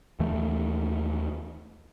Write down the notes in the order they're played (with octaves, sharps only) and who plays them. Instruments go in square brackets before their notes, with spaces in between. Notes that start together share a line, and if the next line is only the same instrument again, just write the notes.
[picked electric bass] D#2 E3 A3